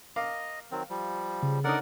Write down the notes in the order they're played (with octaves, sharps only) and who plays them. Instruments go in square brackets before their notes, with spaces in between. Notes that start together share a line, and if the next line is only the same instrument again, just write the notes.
[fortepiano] A#4 F5 D6 [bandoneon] D#5
[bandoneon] D#3 F#3 C4
F3 G3
[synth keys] C#3
[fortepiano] D3 C#4 D#4 [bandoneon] A#4 D5 F#5